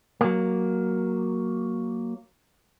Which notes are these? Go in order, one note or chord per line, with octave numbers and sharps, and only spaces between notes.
F#3 A#3